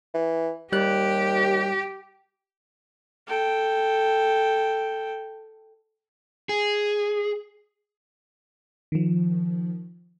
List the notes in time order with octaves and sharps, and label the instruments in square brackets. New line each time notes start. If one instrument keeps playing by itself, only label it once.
[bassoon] E3
[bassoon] D#2 [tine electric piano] G3 F#6 [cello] G4
[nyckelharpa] A4 G5
[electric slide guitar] G#4
[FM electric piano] D#3 F3